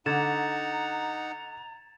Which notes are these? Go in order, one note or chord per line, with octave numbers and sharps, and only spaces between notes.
D3 D#4 F#5 A#5 G#6 A6 E7